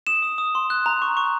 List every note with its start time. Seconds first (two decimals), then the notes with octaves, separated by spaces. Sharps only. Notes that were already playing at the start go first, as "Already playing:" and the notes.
0.07 D#6 E7
0.22 D#6
0.38 D#6
0.55 C6
0.70 F#6
0.86 A#5
1.02 C#6
1.17 C#6